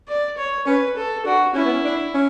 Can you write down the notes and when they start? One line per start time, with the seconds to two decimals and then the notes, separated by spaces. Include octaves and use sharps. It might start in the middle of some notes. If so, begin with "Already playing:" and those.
0.08 D5
0.38 C#5
0.66 C#4 B4
0.96 A4
1.26 D4 F#4
1.55 C#4 E4
1.65 B3
1.73 C#4
1.84 D4
2.14 C#4